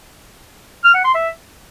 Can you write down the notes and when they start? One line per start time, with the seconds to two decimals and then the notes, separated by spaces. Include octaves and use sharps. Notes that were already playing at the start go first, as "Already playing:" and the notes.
0.84 F6
0.94 F#5
1.05 C6
1.15 E5